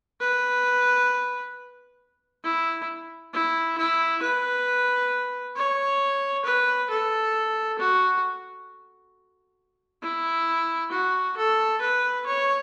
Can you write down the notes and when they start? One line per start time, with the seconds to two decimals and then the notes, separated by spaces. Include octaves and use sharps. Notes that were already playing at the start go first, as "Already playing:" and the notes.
0.21 B4
2.44 E4
3.34 E4
3.78 E4
4.22 B4
5.56 C#5
6.45 B4
6.91 A4
7.79 F#4
10.03 E4
10.91 F#4
11.37 A4
11.81 B4
12.26 C#5